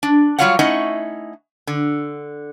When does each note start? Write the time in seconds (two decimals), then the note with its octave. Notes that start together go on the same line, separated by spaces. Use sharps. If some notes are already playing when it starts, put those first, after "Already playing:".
0.03 D4
0.39 F#3 G3 F4 C#5 F5 F#5
0.59 A3 C#4 D#4 E4 D#5 F#5
1.67 D3